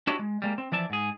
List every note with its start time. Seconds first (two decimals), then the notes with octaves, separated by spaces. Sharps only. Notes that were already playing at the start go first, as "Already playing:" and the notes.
0.07 D4 E4 F#4 G4 C#5 D#5
0.19 G#3
0.42 G3 G#3 A#3
0.58 C4
0.72 E3 F3 D5 E5 A5
0.90 G#2 G#4